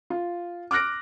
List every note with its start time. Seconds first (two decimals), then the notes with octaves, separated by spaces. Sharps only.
0.10 F4
0.71 D6 F6 F#6 A#6 D7